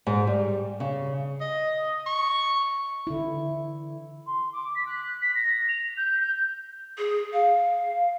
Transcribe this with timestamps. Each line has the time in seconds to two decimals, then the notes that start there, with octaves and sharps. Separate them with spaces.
0.07 G#2
0.27 G3
0.80 C#3
1.41 D#5
2.07 C#6
3.07 D3 E4
4.26 C6
4.52 D6
4.75 B6
4.86 F#6
5.21 B6
5.35 A#6
5.68 F7
5.96 G6
6.18 G6
6.98 G#4
7.33 F5